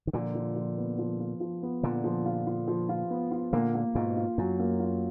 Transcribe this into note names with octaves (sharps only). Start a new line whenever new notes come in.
D#3
A#2 D3 F3
F3
F3
B3
F3
F4
F3
B3
A#2 D3 F4
F3
F4
F4
F3
F4
B3
F4
A#2 D3 A#3
A#3
G#2 B2 F4
F4
F#2 F#3
A#3
F4